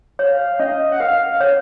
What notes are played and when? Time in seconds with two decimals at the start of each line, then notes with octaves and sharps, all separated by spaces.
0.19 C#5 F5
0.60 C#4 D#5
0.92 F#5
1.00 A#4 F5
1.27 F5
1.40 C#5 F5